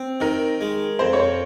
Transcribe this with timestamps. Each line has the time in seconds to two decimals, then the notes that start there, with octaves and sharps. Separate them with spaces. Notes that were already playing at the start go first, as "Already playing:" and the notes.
Already playing: C4
0.20 D#3 A#4
0.61 G#3
0.99 F2 C5
1.13 C#5
1.19 C5